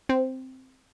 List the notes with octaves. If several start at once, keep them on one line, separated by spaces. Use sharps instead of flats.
C4